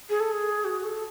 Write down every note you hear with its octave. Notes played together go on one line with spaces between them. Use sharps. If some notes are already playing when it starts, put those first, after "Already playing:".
G#4
A4
G#4
F#4
A4